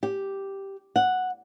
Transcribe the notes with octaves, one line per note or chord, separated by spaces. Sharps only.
G4
F#5